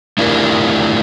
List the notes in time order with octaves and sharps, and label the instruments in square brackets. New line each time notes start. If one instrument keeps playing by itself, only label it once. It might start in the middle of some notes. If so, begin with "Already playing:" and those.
[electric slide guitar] A3 D4 E4 F4 G4 A#4